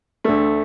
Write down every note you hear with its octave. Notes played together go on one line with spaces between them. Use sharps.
D2 D3 A3